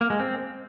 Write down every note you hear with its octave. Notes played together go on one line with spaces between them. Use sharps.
A#3
G#3
C4